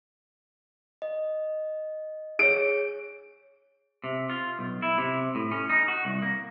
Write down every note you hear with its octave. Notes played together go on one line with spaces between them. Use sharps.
D#5
G#4 C#5 D7
C3
F4
B1
E4
C3
A2
C#4
D#4
F#4
C2
A#3